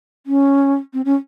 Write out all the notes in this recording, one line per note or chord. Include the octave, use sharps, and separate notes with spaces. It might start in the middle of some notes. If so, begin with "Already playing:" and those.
C#4
C4
C#4